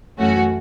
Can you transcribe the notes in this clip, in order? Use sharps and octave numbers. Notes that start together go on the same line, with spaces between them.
F#2 E3 A3 C#4 F#4